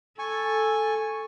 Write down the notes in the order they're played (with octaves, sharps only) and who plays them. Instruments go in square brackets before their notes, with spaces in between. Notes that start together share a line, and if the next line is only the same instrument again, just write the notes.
[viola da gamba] A4 [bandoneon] G#5 C#6